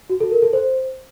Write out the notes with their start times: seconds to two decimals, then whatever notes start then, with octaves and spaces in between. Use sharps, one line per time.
0.10 F#4
0.20 A4
0.31 A#4
0.42 A4
0.53 C5